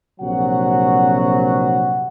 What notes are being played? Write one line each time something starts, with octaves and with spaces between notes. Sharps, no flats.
A#1 C3 F#3 F#4 F#5